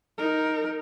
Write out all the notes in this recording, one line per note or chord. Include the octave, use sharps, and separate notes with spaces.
D#4 A#4